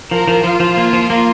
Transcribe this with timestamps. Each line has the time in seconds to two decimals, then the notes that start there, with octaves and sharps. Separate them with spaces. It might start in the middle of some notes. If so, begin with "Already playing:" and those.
0.11 F3 A#4
0.28 F3
0.44 F3 F4
0.60 F3
0.77 A#3
0.93 F3
1.10 A#3